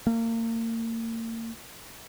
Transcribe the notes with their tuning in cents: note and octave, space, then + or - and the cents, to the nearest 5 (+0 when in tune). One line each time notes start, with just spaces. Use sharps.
A#3 -35